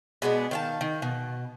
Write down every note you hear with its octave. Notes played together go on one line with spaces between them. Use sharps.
B2 G#3 B3 D4
D#3 F5 A5
D#3
B2